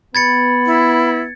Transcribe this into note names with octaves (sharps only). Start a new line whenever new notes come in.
B3 B5 G#6 A6 C#7
E4